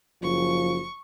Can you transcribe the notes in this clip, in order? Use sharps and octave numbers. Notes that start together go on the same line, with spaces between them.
F#1 F3 C#6